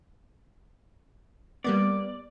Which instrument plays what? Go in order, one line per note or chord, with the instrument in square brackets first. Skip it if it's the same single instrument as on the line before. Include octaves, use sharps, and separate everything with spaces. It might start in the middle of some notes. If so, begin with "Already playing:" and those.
[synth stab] G3 A#3 B3 [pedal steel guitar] D5